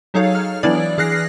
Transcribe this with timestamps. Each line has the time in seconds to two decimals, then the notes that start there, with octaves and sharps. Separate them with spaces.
0.14 F#3 D#4 G#4 A4 C#5 F5
0.35 F6
0.63 E3 F#3 B3 D4 E4 D5
0.98 E3 G#4 F6 F#6 A#6 C7